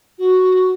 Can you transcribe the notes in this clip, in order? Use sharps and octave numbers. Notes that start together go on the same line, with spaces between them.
F#4